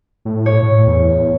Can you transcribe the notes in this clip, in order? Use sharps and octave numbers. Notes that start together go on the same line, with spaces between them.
A2
C#5
A2
E2